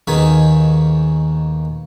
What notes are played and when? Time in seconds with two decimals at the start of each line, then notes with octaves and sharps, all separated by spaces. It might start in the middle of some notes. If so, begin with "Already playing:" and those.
0.07 D#2 B2 D#3 G#4 B5